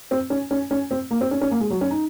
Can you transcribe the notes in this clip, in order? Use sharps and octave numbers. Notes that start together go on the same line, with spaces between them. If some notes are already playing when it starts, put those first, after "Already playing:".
C4
C#4
C#4
C#4
C4
A#3
C4
C#4
C#4
A#3
G#3
F#3
C#4
D#4